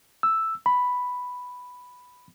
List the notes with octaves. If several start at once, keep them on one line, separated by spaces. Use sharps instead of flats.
E6
B5